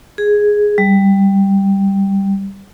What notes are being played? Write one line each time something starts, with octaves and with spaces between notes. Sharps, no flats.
G#4
G3